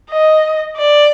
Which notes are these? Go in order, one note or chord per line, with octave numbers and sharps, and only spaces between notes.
D#5
D5